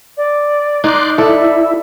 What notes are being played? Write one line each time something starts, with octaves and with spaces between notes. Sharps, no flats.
D5
D#4 C6 D6 F#6
E4 A4 D5 E5